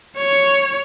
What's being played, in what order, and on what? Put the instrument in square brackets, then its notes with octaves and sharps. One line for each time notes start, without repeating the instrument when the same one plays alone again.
[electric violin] C#5